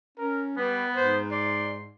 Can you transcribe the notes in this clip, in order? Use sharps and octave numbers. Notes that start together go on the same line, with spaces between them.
C#4 A#4
G3 B3 B4
G#2 C5
D5 C6